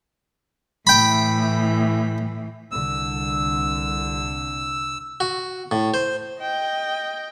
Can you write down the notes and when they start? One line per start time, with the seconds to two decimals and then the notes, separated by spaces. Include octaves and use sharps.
0.87 A2 E3 G5 B5
2.72 C2 D3 E6
5.20 F#4
5.71 A2
5.94 C5
6.40 D#5 G5